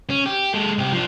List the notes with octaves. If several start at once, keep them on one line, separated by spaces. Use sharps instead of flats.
C#4
G4
G#3 A4
C2 G4
F3 D4